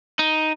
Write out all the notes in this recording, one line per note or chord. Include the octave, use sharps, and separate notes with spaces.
D#4